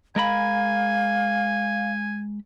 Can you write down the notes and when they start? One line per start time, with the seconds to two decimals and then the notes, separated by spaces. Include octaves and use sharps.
0.16 G#3 A#4 F5 G#5 B5